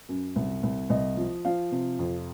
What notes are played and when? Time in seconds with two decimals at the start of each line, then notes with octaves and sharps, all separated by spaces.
0.09 F#2
0.36 C2
0.63 C2
0.90 C2 D#5
1.17 F3
1.45 F3 F5
1.72 C3
1.99 F2